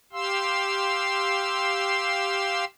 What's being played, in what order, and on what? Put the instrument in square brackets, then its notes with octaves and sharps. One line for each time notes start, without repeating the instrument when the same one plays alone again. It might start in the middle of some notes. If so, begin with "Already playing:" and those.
[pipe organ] G4 F5 C6 E6